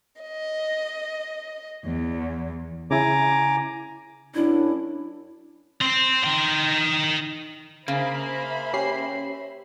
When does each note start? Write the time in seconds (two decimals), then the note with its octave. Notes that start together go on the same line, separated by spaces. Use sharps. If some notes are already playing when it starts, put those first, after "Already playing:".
0.22 D#5
1.84 E2
2.91 C#3 E4 G#5 A#5 D6
4.35 F#2 C#4 D4 E4
5.81 C4 C5
6.24 D#4 G5
7.88 C#3 A#3 C5 E5 B5
8.74 C#4 G4 C7